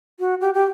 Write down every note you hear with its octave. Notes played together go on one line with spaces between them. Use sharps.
F#4
G4
G4